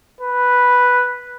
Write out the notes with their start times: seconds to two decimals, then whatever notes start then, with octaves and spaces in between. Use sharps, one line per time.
0.20 B4